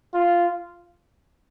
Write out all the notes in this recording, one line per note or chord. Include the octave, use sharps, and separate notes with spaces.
F4